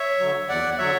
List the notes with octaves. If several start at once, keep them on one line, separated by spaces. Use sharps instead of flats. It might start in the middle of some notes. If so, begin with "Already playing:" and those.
Already playing: C#5 E5
D3 F#3
E2 D5 F#5
D3 F#3 C#5 E5